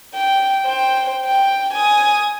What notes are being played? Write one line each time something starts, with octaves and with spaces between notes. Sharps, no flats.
G5
C5 G5
G5
G#5 D#6